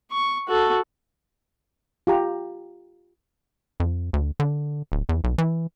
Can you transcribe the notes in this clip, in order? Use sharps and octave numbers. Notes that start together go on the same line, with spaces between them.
C#6
F#4 A4
F4 G4 A#5
F2
D2
D3
D1
E2
B1
E3